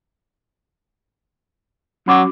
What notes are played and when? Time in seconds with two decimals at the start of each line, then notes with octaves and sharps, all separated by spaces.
2.08 F#3 C#4 F#4 D6